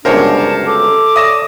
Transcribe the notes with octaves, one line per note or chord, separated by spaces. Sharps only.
G1 C#2 F#2 D4 A#4 C5 C#5
A5
A4 D6
C#5 D5 E5 D#6 A#6 E7